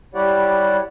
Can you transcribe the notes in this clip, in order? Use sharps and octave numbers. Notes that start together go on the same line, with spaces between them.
G3 E4 G4 C#5 D5 F#5